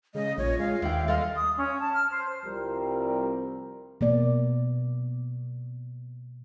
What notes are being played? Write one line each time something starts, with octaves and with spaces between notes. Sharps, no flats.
C#3 G#3 D#5
A#1 F4 C#5
G#3 F5
D#2 D3 E5 G5
G3 A4 D#5 F5 C6
D#6
C#4
A5
F6
C5
C2 F3 G3 C4 A#4
B2 A#3 D5